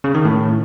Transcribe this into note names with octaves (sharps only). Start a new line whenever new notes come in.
C#3
D#3
A2